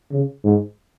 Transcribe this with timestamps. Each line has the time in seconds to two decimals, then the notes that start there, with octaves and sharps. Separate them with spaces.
0.11 C#3
0.44 G#2